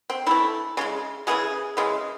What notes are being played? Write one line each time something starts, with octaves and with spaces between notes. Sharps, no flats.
C4
E3 A3 E4
C#3 E3 G#3
C#3 E3 G#3 G#4
C#3 E3 G#3